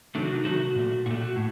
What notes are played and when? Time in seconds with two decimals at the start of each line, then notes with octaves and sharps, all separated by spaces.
0.15 C3 D#3 F#3 A3 D4
0.25 F#4
0.35 D#4
0.45 C3 D#3 F#3 A3 F#4
0.76 A#2 A3
1.06 A#2 A3 F#4
1.21 F#4
1.36 A2